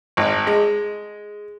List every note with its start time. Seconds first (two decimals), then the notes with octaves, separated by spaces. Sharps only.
0.17 G#1
0.47 G#3